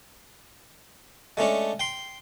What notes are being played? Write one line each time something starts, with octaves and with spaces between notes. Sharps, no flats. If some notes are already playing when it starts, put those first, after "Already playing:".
G#3 A3 C#4 D4
G5 C6